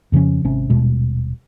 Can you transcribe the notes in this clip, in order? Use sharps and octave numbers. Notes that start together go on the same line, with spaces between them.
F2 C#3 F3 C#4
G#1 C3 C#4
D#1 B2 G#3